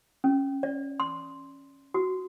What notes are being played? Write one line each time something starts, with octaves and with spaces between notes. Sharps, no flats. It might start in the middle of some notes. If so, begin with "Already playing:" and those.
C#4
D5
C6
F#4